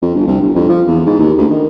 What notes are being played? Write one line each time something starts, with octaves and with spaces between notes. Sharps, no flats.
F2
G1
C2
G1
F2
F3
E2
G#2
D#2
D2
D#3